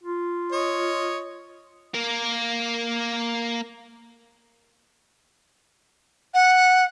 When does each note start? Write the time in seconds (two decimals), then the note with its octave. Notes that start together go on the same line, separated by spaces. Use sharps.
0.04 F4
0.52 C#5 D#5
1.94 A#3 A#4
6.34 F#5